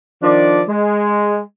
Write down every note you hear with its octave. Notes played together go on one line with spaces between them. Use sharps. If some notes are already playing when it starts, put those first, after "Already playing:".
D#3 F3 D4 D5
G#3